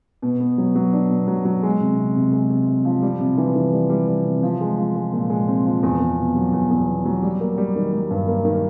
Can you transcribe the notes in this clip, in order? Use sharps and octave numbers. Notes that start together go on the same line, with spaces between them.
B2
B3
F#3
F#3
D4
B2
F#3
F#3
G#3
C3
C3
C3
G#3
C3
C3
F3
G3
C3
E3
E3
G3
G3
G3
C3
F3
G#3
F3
G#3
A#2
G#3
C4
F3
E2
E2
B2
F#3
E2
E2
B2
F#3
G3
A#3
G3
D#3
G3
G2
A#3
D#3